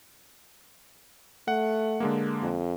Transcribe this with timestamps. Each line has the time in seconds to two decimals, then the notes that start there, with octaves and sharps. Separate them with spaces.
1.48 A3 F#5
2.00 D3 G#3 A#3
2.42 F2